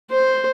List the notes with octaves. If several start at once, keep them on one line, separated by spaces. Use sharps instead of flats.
C5